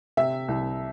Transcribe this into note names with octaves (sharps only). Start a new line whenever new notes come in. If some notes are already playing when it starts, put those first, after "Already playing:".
C3 E5
C2